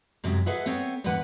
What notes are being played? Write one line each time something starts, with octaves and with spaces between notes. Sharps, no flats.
F#2 C3 F#3 G#3
G#4 A4 B4 D#5 E5 F#5
B3 C4 A4 C#5
E2 G#2 D3 B4 F#5